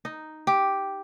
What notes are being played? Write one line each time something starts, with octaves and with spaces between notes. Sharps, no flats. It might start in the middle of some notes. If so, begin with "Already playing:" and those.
D#4
G4